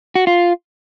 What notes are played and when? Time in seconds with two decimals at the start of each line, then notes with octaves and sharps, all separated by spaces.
0.15 F#4
0.27 F4